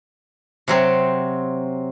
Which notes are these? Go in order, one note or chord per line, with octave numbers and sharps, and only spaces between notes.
C3 F#3 C4